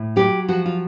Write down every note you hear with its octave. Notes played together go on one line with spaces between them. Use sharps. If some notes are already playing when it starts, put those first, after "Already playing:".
Already playing: A2
F#3 G4
F3 F#4
F4